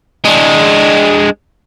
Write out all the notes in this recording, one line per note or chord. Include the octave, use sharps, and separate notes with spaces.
G#3 D4